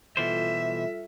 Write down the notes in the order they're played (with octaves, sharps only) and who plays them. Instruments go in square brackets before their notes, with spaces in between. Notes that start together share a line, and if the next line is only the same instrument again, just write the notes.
[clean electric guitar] B2 E3 C5 [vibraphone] G3 F4 A4 [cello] E5